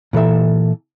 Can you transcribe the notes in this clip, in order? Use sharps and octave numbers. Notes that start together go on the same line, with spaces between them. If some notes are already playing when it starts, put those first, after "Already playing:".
A#2 E3 A4 E5